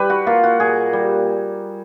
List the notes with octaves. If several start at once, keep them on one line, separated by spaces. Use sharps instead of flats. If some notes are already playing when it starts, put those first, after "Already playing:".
Already playing: G3 B4
F#4
A#3 F4
F#4
A#2 G#4
G3